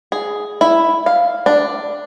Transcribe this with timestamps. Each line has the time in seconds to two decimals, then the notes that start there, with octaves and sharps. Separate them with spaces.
0.12 G#4
0.61 E4
1.06 F5
1.46 D4